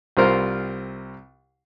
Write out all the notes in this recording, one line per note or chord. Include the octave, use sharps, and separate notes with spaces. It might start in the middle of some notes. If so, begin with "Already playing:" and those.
C2 G3 C4 F4 A#4 C5